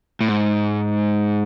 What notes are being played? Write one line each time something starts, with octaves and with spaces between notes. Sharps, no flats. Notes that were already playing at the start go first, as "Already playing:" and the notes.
A2
G#2